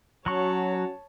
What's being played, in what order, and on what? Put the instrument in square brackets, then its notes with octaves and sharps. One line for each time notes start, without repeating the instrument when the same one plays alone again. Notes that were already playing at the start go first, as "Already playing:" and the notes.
[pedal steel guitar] F#3 C#6 [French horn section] C#4 F#4 [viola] C#5 A5